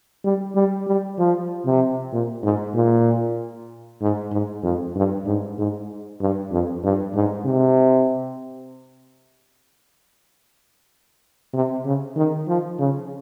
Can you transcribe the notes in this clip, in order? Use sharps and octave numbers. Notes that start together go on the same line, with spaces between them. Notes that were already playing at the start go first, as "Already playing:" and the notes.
G3
G3
G3
F3
C3
A#2
G#2
A#2
G#2
G#2
F2
G2
G#2
G#2
G2
F2
G2
G#2
C3
C3
C#3
D#3
F3
C#3